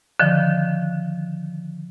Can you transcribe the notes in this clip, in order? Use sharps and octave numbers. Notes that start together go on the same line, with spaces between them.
D3 D#3 F3